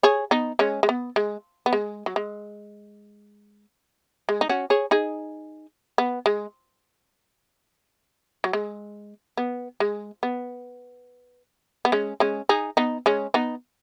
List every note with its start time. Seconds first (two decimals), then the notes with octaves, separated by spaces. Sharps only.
0.03 G#4 C#5
0.31 B3 D#4
0.59 G#3 C#4
0.83 G#3
0.89 B3
1.16 G#3
1.66 B3
1.73 G#3
2.06 F#3
2.16 G#3
4.29 G#3
4.41 D#4
4.49 C#4 F#4
4.70 G#4 C#5
4.91 D#4 G#4
5.98 B3
6.26 G#3
8.44 F#3
8.53 G#3
9.37 B3
9.80 G#3
10.23 B3
11.85 B3
11.92 G#3 C#4
12.20 G#3 C#4
12.49 D#4 G#4
12.77 B3 D#4
13.06 G#3 C#4
13.34 B3 D#4